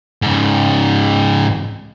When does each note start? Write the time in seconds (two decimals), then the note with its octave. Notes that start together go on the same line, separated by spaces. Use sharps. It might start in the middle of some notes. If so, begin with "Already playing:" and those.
0.22 G#2 C#3